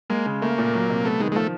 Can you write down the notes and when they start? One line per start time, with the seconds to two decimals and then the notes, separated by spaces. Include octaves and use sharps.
0.10 G#3 A#3
0.26 C#3
0.42 A3 A#3
0.58 A#2
0.74 F#3
0.90 C3
1.05 A3 B3
1.20 D#3 G#3
1.32 G#3
1.36 F3 A3